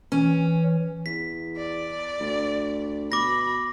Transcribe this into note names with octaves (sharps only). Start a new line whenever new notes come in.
E3 C#4
E2 B6
D5
D2
B2 B5 D6 A#6